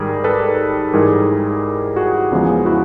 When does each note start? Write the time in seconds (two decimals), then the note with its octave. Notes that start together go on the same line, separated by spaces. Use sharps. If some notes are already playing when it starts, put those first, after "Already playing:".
Already playing: G#2 D#3 G3 G#4 A#4
0.24 A4 B4
0.93 G#2 E3 G3 G#4 A#4
1.96 F#4 G#4
2.32 E2 C#3 F3 G#3
2.66 E4 F#4